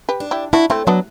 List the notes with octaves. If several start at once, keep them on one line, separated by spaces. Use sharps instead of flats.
G4 B4
D4
E4 G4
D4 E4 F#4
A3 C4 E4
F#3 B3 D4